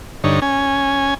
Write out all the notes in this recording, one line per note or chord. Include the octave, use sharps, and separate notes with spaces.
G2 D3 D#4 C#5
C#4 G#5